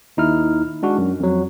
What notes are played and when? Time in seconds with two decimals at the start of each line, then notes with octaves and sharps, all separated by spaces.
0.17 D#2 D#4 E4 F6
0.83 G#3 D4 F#4
0.98 F#2
1.20 F2 F#3